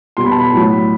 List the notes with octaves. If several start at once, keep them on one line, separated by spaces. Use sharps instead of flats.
B2 G3 C6
B5
A5
B5
A2 F#3